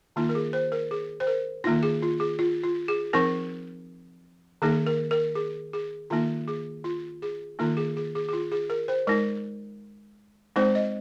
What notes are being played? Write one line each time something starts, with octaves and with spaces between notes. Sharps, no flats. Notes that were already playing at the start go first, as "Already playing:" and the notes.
D#3 A#3 D#4 F4
A#4
G#4
C5
A#4
G#4
C5
A#4
D#3 A#3 D#4 F4
G#4
F4
G#4
F4
F4
G#4
F3 C4 D#4 A#4
D#3 A#3 D#4 G#4
A#4
A#4
G#4
G#4
D#3 A#3 D#4 F4
G#4
F4
G#4
D#3 A#3 D#4 F4
G#4
G#4
G#4
G#4
F4
G#4
A#4
C5
G#3 D#4 A#4
G#3 C4 D#4 C5
D#5